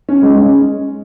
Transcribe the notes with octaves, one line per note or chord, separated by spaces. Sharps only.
C#4
G#3
C#4